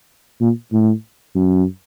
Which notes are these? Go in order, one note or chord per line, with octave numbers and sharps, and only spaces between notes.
A#2
A2
F#2